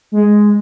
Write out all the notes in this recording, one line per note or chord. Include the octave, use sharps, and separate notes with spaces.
G#3